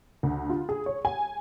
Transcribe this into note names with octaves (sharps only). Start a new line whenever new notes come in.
D2
F4
G#4
C#5
G#5